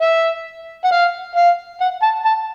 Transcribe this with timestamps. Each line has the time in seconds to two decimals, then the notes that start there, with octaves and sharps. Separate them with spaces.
0.01 E5
0.84 F#5
0.91 F5
1.35 F5
1.81 F#5
2.03 A5
2.25 A5